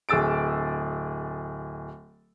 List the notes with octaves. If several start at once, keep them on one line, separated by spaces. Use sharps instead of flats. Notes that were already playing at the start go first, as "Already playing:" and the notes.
D1 G#4 E6 A6 D7